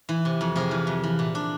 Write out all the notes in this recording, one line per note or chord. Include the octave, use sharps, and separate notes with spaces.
E3
C3
F2
C3 G#4 A#4
E3
F2
E3
A#2
D4